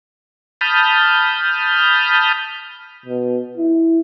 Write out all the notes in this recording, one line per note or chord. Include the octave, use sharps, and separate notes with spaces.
A5 B5 D#6 F6 G6
B2
E4